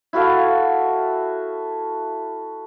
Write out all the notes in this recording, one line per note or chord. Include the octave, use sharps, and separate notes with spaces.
E4 F#4 A4 F5